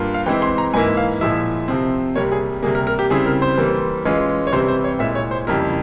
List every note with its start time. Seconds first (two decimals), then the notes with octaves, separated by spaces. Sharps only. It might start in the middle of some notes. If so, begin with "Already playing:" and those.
Already playing: G2 A#3 F4
0.14 F5
0.26 E3 G#3 C4 E4 G5
0.42 C6
0.58 A#5
0.74 G#2 E3 A#3 E4 G#5
0.97 F5
1.21 A#2 F3 G#3 E4 E5
1.68 C3 F3 C4
2.16 C3 G3 A#3 C#5
2.32 G#4
2.63 C3 G3 A#3 G#4
2.75 A#4
2.87 A#4
2.99 G4
3.10 C#3 G3 C4 E4 G#4
3.26 A#4
3.42 C5
3.58 E3 G3 A#3
4.05 E3 G#3 C#4 F4
4.47 C#5
4.52 C3 E3 G3 C4 C5
4.68 C5
4.84 C#5
4.99 A#2 G#3 E4 E5
5.15 C#5
5.31 C5
5.47 F2 C#3 G3 A#3 E4 A#4